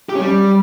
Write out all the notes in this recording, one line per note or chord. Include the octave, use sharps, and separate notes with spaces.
G4
C#4
G3